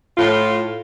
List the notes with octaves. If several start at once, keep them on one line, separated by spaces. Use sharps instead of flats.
A2 F4